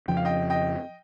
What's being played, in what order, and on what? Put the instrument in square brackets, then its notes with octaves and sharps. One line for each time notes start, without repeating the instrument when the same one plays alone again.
[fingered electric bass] F2 C#3 F3 [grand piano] G5
[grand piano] F5
D#5 G5
D#5 G5